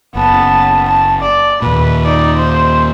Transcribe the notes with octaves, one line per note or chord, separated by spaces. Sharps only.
F#1 B3 A5
A5
D5
D#2 A#2 B4
D#4 D5
C5